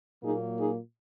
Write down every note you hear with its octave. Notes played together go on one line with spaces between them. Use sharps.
A#2 F#3 A#3 D#4 G#4
D#4 G#4